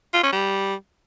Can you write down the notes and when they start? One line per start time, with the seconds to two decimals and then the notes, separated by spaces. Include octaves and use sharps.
0.13 F4
0.23 C#4
0.32 G3